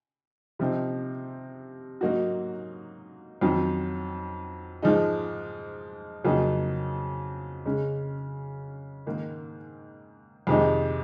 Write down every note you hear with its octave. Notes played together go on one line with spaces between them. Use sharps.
C3 F3 C4 D#4
G#2 F#3 A#3 D#4 F#4
F2 D#3 F#3 C4
G#2 F3 G#3 D#4
F2 C#3 F#3 A#3 D#4
C#3 G#3 C#4
G#2 D#3 A#3
F2 C3 D#3 G#3 D#4